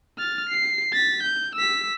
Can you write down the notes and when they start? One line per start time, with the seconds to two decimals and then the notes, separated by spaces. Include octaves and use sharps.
0.18 F6 A6
0.49 C7
0.92 A6 B6
1.23 G6
1.55 E6 B6